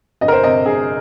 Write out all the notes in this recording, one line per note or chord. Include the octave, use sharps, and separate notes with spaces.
G1 D#5
A#4
C5
C3 D#5
G1 G#4